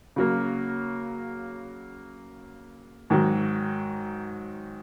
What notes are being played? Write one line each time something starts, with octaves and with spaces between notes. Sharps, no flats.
C#3 F#3 A#3
G#2 D#3 F#3